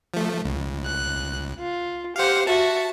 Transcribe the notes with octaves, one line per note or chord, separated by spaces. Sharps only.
F3 A3
C#2
F#6
F4
G4 C5 F5 F#5
F#4 E5 A5